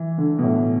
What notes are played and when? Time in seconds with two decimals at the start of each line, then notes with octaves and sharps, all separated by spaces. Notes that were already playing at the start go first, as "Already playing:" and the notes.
Already playing: E3
0.18 D3
0.39 B2
0.43 A2